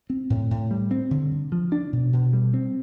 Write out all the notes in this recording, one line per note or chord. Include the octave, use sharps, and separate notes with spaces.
C4
A2
A2
G3
C4
D3
D3
F3
D4
B2
B2
G3
C4